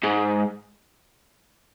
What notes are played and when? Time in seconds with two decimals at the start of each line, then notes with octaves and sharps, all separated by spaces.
0.04 G#2